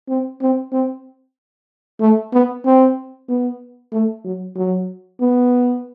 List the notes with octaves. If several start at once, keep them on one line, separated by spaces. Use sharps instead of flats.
C4
C4
C4
A3
B3
C4
B3
A3
F#3
F#3
B3